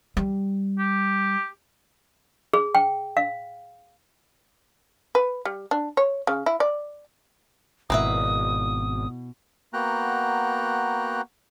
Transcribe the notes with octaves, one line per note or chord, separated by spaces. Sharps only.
G3
G4
G#4
G5
F5
B4
G3
D4
C#5
C#3
E4
D5
G#1 B2 A#3 E4 B4 E5 D#6
A#3 B3 F#4 G5 A#5 F#6